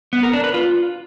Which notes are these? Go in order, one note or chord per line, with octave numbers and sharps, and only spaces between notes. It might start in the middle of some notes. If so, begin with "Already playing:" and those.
B3
A#4
D4
B4
F4